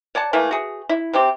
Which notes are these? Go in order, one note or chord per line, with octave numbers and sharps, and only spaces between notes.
C#5 D5 F#5 A5
E3 A3 A#3
F#4 G#4
E4
C3 C4 G4